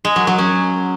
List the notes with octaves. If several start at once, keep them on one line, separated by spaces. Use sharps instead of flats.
G#3
F#3
F#3
C#4